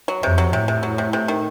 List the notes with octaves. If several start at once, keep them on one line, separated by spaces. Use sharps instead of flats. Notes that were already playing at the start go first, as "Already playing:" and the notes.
F#3
F2 C3
F#3
A2 C3
C3
F#3
C3
C3
D#3